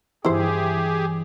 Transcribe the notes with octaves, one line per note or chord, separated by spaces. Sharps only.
G2 E3 E4 G4 G#4 C5